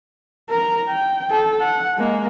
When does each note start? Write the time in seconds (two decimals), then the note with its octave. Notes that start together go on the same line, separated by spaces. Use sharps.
0.49 A#4 A#5
0.88 G5
1.30 A4
1.60 F#5
1.98 G#3 A#3